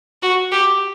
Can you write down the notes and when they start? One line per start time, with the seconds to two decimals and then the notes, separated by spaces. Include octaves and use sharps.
0.23 F#4
0.52 G4